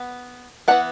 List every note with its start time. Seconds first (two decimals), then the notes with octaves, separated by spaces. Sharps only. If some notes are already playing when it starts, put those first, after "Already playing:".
Already playing: B3
0.68 E3 B3 D4 F#5